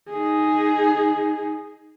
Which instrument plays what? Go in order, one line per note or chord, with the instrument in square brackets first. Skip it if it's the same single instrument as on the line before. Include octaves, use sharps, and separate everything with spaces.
[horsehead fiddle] D#4 G#4